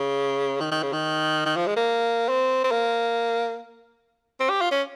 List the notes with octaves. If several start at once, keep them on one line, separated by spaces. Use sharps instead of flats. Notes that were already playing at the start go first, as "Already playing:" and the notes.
Already playing: C#3
D#3
D#3
C#3
D#3
D#3
F3
G#3
A#3
C4
C4
A#3
C4
G4
F4
C#4